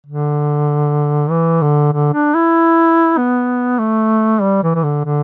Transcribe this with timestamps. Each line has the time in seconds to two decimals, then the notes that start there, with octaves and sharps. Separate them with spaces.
0.06 D3
1.30 E3
1.62 D3
1.92 D3
2.13 D4
2.35 E4
3.17 B3
3.79 A3
4.41 G3
4.63 E3
4.75 E3
4.83 D3
5.04 D3